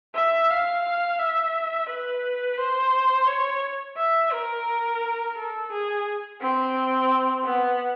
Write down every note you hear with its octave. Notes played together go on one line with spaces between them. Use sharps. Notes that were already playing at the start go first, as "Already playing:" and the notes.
E5
F5
E5
B4
C5
C#5
E5
A#4
A4
G#4
C4
B3